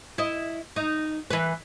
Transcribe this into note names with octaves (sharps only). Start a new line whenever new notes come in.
E4 D#5
D#4
E3 B4